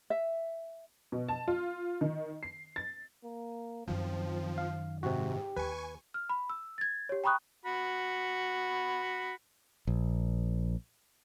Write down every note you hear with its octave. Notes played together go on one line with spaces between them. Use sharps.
E5
B2
A5
F4
D#3
C7
A6
A#3
F#2 D#3 F3 C4
F5
G#2 C3 F#4 G4
D#2 B4 G#5 C#6
F6
B5
E6
G#6 A6
G4 C#5
G5 A#5 B5 C#6 D#6 F#6
F#4 B5
A#1